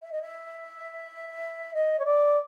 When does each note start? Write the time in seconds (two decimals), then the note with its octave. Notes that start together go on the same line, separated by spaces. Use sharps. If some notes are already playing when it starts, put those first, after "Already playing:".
0.02 E5
0.12 D#5
0.22 E5
1.74 D#5
1.99 C#5
2.05 D5